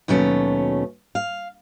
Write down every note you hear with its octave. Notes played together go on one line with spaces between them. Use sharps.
D#2 B2 F#3 A3 C#4
F5